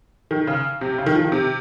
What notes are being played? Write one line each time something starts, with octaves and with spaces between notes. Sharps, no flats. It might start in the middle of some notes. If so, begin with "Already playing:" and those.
D#3
C#3
C3
C#3
D#3
F3
D#3
C3